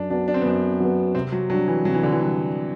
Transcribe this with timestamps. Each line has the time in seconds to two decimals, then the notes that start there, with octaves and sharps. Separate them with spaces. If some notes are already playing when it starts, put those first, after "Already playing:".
Already playing: F#2 D4
0.10 F#3 D4
0.13 B3
0.28 D4
0.34 C4
0.42 B3
0.46 F#2 C4
0.80 F#3 B3
1.14 C3 C4
1.32 F#3
1.50 F#3 G3 D4
1.67 E3
1.85 C3 F#3
1.94 E3
2.03 D3
2.11 E3
2.20 G3 D4